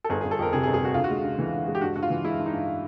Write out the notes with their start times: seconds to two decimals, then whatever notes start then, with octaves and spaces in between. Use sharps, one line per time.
0.04 A4
0.09 G1 G#4
0.21 G1 G#4
0.31 A4
0.39 F2 A#4
0.53 C3 G#4
0.63 G#4
0.67 G1
0.74 G#4
0.81 G1 F#4
0.94 D2 F4
1.04 F#4
1.10 G#3
1.24 C#3
1.38 E3
1.53 D2
1.67 G#3
1.75 G4
1.81 G2 F#4
1.96 G2 F#4
2.03 F4
2.10 E3
2.24 G#3 E4
2.38 G2
2.46 D#4
2.53 G2